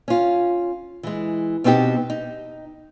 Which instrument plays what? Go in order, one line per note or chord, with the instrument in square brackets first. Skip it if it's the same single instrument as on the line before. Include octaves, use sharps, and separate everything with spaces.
[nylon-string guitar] C#4 F4
E3 G#3
B2 B3 C4 D#4 G4
D#4